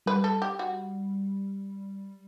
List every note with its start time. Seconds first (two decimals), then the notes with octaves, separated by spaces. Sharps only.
0.06 G3 B4
0.24 A4
0.42 G4
0.59 F#4